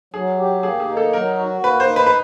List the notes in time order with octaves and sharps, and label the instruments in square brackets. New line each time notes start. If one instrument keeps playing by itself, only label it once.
[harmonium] F#3 [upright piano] G#4
[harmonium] G4
[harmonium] A#3 [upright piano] G#4
[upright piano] G#4
[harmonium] D#4
[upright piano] A4
[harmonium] F#3 [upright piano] A#4
[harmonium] F#4
[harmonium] A#3 [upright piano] B4
[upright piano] C5
[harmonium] D#4
[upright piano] B4
B4